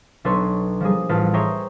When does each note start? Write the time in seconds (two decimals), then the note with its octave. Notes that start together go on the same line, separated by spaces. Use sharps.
0.24 B1 D4 A4 B4 C#5 C6
0.80 F3 G3 A#3 G#4
1.09 A1 F4 B4 A5
1.34 G#4 C5 C#5 E5 G5 A#5